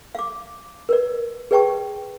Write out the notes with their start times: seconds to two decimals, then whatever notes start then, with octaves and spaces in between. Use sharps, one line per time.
0.15 F5 D6
0.89 A#4 B4 D5
1.51 G#4 B4 D5 G5 A5 C#6